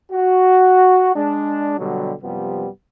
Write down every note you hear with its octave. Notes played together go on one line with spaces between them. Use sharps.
F#4
G#3 D4
B2 D3 F#3 G3
F#2 C3 F3 G3 B3